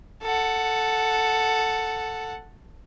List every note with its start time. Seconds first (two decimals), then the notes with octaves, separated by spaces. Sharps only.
0.22 A4 F#5